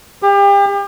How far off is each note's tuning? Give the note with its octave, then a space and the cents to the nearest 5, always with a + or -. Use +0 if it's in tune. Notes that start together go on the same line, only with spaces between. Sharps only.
G4 +35